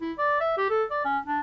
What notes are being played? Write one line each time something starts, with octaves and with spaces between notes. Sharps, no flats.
E4
D5
E5
G4
A4
D5
C#4
D4